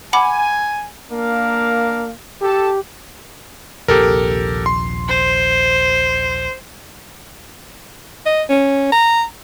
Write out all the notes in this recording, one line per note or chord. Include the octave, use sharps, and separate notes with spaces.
F#5 G#5 B5 D6
A#3 D4 A#4 F5
G4 A4 A5
A#1 D#2 C3 G4 A4 A#4
C6
C5
D#5
C#4
A#5